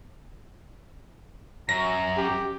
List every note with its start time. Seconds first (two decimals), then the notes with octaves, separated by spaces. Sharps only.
1.69 F#2 A#5 A#6
2.17 G4